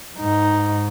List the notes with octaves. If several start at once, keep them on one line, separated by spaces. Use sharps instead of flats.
G#2 D#4